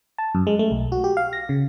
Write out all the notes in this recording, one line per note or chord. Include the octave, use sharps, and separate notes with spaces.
A5
F#2
G#3
A3
B1
F#4
G4
F5
A#6
C#3